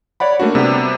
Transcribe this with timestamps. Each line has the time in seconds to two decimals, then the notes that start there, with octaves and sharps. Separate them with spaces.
0.20 C#5 D5 F#5 B5
0.40 A3 A#3 D4 F#4
0.55 C3 G3 B3 G4